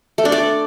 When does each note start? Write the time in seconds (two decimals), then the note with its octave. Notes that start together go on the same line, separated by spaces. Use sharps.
0.18 A3
0.25 D4
0.32 D5